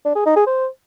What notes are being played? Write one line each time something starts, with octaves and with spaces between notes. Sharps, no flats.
D4
G#4
D#4
G#4
C5